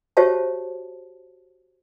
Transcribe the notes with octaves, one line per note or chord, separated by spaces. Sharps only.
F#4 G4 C5 C#5 E5 A5